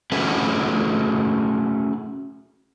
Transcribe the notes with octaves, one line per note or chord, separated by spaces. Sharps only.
A3 C#4 F#4 G#4 B4